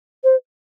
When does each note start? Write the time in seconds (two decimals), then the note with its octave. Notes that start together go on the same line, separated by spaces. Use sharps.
0.24 C5